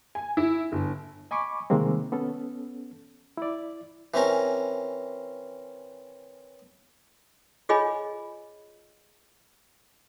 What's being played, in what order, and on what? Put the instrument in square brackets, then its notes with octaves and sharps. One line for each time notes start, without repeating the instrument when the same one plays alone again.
[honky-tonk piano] G#5
E4
G1
[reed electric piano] D#5 G#5 B5 C#6 D6
C3 D#3 G3 G#3 A#3 C4
B3 C#4 A4
E4 D5
[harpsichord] E3 C4 C#4 A#4
[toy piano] F4 G#4 C#5 D#5 G#5 B5